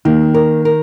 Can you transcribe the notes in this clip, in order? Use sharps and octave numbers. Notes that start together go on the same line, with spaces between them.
D#3 A#3
A#4
A#4